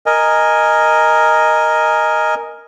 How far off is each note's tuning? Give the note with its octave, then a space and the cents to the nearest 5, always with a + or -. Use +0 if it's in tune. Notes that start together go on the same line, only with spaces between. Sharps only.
A#4 +0 D#5 +0 G#5 +0